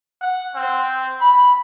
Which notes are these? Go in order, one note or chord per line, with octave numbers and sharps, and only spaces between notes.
F#5
C4
B5